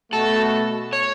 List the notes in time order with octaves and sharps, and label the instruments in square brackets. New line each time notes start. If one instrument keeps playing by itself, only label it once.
[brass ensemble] B2 A3 F#4 [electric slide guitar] A4
[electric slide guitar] C#5